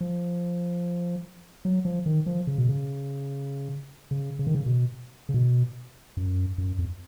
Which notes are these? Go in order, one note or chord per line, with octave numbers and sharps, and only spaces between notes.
F3
F#3
F3
D#3
F3
C#3
B2
C#3
C#3
C#3
D#3
C#3
B2
C#3
B2
F#2
F#2
F2